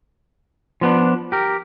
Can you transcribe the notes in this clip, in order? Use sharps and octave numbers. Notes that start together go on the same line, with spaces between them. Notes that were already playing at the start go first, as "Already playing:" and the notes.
F3 B3 D4
G4 A#4